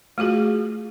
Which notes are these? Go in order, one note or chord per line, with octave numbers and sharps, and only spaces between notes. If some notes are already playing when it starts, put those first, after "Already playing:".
A3 F4 F#4 G#4